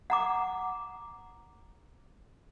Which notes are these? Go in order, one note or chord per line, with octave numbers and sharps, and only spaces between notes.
F#5 A#5 D6